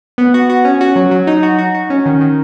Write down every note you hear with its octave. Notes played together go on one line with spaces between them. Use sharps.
B3
F#4
F#4
C#4
F#4
F#3
F#3
D#4
F#4
F#4
F#4
C#4
D#3
D#3